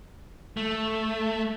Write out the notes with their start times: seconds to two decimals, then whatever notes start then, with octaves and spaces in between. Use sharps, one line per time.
0.57 A3